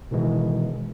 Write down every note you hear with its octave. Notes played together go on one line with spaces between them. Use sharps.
B2 D#3 E3 G#3